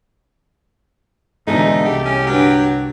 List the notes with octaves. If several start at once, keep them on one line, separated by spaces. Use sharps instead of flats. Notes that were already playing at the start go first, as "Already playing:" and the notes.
E2 G#2 B2 D3 G#3 A3 D#4
C2 G4
C#4
G2 D3 F#3